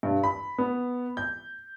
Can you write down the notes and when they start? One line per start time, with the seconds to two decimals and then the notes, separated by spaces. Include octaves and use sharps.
0.03 G2
0.23 B5
0.58 B3
1.17 G6